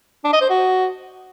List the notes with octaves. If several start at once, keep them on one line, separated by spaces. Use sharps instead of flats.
D4
D#5
C5
F#4